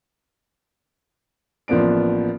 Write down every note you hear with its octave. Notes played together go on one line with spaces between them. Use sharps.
A1 F3 A#3 B3 D4 D7